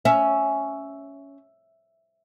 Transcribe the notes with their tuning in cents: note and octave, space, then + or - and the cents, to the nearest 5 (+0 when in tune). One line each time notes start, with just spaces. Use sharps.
C#4 +10 E5 +5